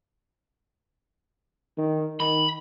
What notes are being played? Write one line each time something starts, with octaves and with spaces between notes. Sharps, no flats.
D#3
D#3 B5